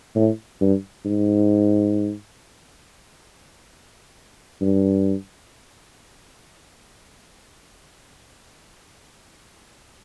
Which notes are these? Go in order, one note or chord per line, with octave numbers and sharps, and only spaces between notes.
A2
G2
G#2
G2